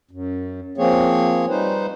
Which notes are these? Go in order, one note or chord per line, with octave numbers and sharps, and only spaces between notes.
F#2
F3 A#3 C4 G#4 C#5
G3 D#4 B4 C5